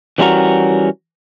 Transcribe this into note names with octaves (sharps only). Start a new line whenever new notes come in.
E3 G3 C#4 E4 F#4 A#4